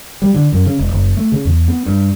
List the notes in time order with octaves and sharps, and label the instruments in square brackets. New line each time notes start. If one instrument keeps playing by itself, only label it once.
[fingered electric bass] G3
D3
F#2
C#3
E1
F#1
A3
C#3
E2
B3
G2